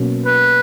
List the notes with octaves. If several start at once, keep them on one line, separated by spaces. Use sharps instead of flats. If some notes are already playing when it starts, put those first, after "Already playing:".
Already playing: B2 F#3 A#3 C#4
B4